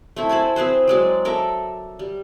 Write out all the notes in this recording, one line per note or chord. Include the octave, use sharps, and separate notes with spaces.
A3 C4 E4
C5 G#5 A5 B5
C4 G#4 B4 C5
F#3 G#3 D5
A4 A#4 D5 E5
G3